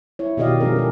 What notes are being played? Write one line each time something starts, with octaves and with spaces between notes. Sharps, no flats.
E4 C#5
B2 D#3 G4 D5 D#5 F5
F3 G#3 C#4 G#4 A#4
A4 A#4